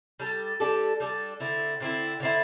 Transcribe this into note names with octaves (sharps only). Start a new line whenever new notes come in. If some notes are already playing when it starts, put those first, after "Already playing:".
G3 D4 A4
G3 D4 A4
G3 D4 A4
D3 C4 E4
D3 C4 E4
D3 C4 E4